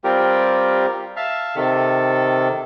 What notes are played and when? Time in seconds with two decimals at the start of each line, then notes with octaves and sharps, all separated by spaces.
0.04 G3 C4 F4 G4 A#4
1.16 E5 F5 A5
1.56 C3 D#3 A4